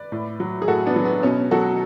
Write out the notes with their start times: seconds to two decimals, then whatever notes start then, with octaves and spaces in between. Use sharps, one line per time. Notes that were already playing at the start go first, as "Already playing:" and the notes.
Already playing: B4 D5
0.12 A2
0.40 F#3
0.62 G#4
0.68 A2 F#4 A4
0.86 B3 D4
0.96 F#3
1.05 B3
1.23 B2 C#4
1.51 F#3 F#4 A4